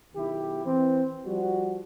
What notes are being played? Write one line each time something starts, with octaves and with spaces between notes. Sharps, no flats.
B1 D#3 E4 G4
E3 C4
F3 G3 F#4